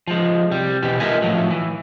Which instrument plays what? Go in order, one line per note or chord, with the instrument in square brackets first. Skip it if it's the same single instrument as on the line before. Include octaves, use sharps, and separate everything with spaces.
[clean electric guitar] F3 G#3
C2 G3
B2 E3 G4
G#3 F4 A#4 D#5 E5 G#5
A2 F3 F#3
E3